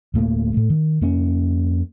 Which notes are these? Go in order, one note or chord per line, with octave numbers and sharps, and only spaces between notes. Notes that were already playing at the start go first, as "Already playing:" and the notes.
D1 A2 A3 A#3
A2 A3
D#3
F2 A#3 C#4